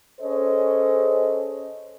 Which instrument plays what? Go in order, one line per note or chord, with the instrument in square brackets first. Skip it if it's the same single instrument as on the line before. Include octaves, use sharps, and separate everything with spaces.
[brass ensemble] C#4 G#4 A4 C5 C#5 D#5